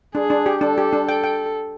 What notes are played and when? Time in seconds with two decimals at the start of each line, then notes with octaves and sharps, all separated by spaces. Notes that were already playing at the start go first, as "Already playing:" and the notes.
0.15 D4 G#4
0.30 D4
0.46 G4
0.61 D4 A4
0.78 G4
0.93 D4
1.08 A4 G5
1.24 G5